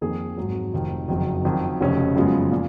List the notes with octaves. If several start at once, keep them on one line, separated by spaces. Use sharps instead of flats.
F2 D#3 A#3 D#4 G#4
G#1 G#2 F#3
F1 F2 D#3
F#1 F2 D#3 F#3
F2 D#3 F#3
F1 F2 C#3 F#3 C#4
F#2 C#3 F3 G#3 B3
A#2